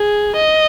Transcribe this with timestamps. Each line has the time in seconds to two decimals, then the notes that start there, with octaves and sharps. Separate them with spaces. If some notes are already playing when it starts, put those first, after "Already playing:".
Already playing: G#4
0.37 D#5